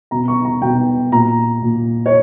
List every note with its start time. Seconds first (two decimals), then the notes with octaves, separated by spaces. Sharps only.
0.11 B2 A#5
0.28 C#6
0.45 A#5
0.62 B2 G5
1.12 A#2 A#5
1.62 A#2
2.06 C#5